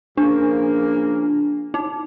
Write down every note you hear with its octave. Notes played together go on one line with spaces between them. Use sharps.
C#3 F3 A#3 D4
D#4